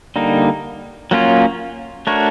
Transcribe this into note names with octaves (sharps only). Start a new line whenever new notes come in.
D3 G3 A#3 D#4
F#3 A#3 C#4 F4
A3 D4 F#4 A#4 C#5